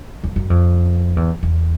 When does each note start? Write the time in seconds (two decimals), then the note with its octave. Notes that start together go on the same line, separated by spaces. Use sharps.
0.24 F2
0.36 F#2
0.50 F2
1.16 E2
1.43 E2